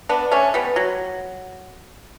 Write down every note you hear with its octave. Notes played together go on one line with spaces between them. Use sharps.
B3 D4
A3 C#4
G3 B3
F#3